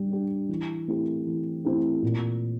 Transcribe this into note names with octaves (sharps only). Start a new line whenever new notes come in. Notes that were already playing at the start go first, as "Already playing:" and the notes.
Already playing: G3 D4 G4
D4 G4
E3
A3 C4 E4 G4
E3
A3 C4 E4 G4
A#2